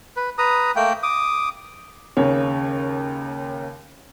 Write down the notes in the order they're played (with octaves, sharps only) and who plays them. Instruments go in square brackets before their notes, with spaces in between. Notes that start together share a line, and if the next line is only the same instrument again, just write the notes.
[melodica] B4
B4 A#5 D#6
A3 A#3 G5
D6 D#6
[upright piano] D#2 C#3 C#5